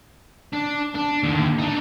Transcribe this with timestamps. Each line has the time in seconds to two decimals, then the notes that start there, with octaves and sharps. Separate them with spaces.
0.53 D4
0.95 D4
1.23 D#2 D3
1.58 D4 D#4